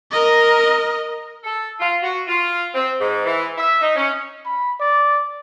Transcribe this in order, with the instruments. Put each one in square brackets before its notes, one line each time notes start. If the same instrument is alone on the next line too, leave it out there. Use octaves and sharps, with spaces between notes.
[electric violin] A#4 D#5
[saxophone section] A4
F4
F#4
F4
C4
G#2
E3
E5
D#4
C#4
[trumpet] B5
D5